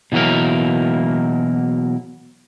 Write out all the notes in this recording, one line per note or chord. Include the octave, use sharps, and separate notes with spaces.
B2 E3 F#3 A#3 A#4